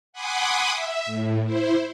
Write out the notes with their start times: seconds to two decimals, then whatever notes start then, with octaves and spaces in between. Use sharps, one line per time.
0.13 F#5 G#5 B5 C6 D6 D#6
0.70 E5
1.06 A2
1.43 E4 C5